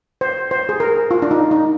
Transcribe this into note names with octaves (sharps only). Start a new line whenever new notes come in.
C5
C5
G#4
A#4
F4
D4
D#4
D#4